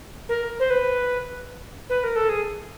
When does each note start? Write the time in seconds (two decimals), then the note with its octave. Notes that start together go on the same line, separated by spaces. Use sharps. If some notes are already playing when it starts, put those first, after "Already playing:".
0.29 A#4
0.59 C5
0.70 B4
1.89 B4
2.03 A#4
2.16 A4
2.29 G#4